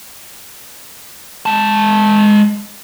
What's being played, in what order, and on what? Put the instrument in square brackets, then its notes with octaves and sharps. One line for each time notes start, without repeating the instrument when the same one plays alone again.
[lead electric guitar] G#3 A5